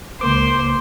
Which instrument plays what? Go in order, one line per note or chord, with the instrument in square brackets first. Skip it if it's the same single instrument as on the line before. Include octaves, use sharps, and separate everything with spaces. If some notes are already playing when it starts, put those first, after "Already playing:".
[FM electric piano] C#2 A#3 D6 [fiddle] C5